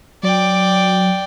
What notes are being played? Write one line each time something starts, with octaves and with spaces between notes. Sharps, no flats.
F#3 D5 G5